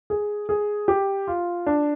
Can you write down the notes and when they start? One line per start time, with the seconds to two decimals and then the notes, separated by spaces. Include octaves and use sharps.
0.10 G#4
0.49 G#4
0.88 G4
1.27 F4
1.67 D4